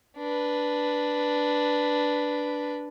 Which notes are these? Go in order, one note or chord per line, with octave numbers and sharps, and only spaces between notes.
D4 B4